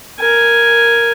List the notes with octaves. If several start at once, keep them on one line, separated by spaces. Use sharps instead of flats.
A#4 G#5